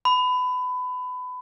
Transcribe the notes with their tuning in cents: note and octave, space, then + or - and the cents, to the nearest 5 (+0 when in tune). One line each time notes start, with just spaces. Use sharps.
B5 +25